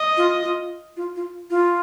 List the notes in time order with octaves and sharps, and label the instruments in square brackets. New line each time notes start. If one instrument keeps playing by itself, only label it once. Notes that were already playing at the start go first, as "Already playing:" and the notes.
Already playing: [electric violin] D#5
[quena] F4
F4
F4
F4
F4